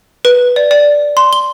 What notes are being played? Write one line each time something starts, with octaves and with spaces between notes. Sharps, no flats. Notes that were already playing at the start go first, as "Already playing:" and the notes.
B4
D5
D5
C6
G7